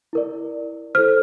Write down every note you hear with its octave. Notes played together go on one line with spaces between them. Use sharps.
E4 A#4 D5
E4 A4 C5 F6